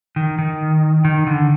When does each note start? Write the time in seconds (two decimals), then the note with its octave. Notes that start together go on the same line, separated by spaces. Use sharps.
0.16 D#3
0.38 D#3
1.05 D#3
1.27 D3